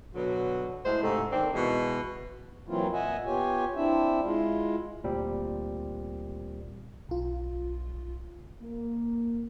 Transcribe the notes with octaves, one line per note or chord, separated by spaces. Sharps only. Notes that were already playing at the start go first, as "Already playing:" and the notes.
B2 D3 F#3
A2 G#3 C5
G#2 C3 A3
D#3 A#3 C4 D4
B2 E3 G#3
E3 F#3 A#3 C4 E4 F4
A#2 D#5 E5 F#5 G#5
B3 F4 G4 C#5 G#5
C4 D4 E4 E5
G#3 E4 F4
D2 A#2 G3 C4
B1 F4
A#3